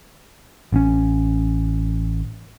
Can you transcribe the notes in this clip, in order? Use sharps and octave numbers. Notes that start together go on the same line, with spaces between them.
A1 C4 C#4